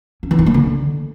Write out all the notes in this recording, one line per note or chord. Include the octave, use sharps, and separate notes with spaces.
C#4
E3
D#4
A#3
D3